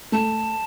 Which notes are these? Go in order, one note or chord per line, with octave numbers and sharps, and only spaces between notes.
A3 A5